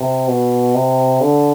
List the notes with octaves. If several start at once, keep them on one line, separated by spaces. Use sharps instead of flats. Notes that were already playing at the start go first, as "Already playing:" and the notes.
Already playing: C3
B2
C3
D3